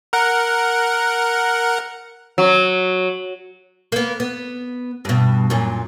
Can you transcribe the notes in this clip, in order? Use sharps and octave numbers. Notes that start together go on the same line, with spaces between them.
A#4 F#5
F#3
A#3 B3
B3
G2 B2
F#2 A#2